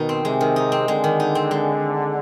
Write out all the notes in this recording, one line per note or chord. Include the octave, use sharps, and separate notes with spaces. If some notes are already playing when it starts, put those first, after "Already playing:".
Already playing: B2 D#3 D#4
C4
C3 G#3
D#3
D#4
C4
D3 G#3
D#3
D#4
C4
G#3